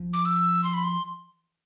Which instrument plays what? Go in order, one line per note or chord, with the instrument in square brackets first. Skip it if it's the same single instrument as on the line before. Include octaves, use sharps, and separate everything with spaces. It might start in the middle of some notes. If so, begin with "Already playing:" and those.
Already playing: [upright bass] F3
[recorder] D6
E6
C6
B5
C6